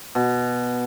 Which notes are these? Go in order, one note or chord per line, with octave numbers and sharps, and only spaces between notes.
B2